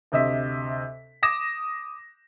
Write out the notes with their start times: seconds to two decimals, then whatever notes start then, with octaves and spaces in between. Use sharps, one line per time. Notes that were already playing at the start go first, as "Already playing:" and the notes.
0.12 D2 C3 D#5 E5 B6
1.23 D6 D#6 A#6 E7